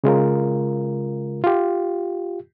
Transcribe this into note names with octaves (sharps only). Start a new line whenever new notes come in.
C#3 G#3 F4 A#4
F4 G4